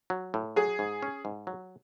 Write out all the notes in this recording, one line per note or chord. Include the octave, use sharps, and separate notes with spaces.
F#3
A2
F#3 G#4
G#2
C#4
G#2
F#3